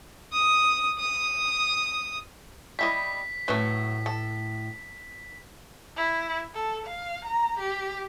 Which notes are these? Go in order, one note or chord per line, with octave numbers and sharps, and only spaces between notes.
D#6
D#6
G3 E4 D#5 B6
A2 F#3 A3 B4 C6
A4
E4
A4
F5
A#5
G4